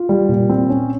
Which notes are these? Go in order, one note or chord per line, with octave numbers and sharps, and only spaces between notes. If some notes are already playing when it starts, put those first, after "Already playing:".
Already playing: F4
G3
A#2
C4
C#4